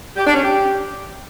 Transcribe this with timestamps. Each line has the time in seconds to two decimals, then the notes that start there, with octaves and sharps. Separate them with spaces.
0.16 G4
0.25 D4
0.34 C#4
0.43 G4